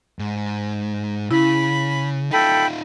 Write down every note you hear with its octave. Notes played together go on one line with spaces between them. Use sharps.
G#2
C#3 E4 B5
D#4 F4 A4 G5 B5